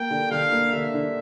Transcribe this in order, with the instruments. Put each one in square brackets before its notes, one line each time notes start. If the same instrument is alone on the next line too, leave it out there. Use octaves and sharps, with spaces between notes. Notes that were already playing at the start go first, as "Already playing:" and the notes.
Already playing: [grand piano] A#3 [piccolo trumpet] G5
[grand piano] D3
[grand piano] D3 [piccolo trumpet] F5
[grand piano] A#3
[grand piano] D3 [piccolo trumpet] E5
[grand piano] D3